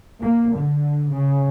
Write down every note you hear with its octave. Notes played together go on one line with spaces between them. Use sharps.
A#3
D3
C#3